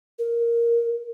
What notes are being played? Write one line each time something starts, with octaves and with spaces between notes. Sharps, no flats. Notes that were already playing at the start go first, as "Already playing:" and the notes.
A#4